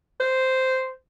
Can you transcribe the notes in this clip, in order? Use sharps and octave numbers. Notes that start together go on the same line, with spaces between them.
C5